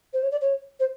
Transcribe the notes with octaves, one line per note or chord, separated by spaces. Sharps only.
C5
C#5
D5
C#5
C5